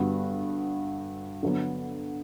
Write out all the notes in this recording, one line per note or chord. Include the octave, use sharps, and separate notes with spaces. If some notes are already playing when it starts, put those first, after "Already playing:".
Already playing: G2 D3 G3 B3 F#4
D3 F#3 B3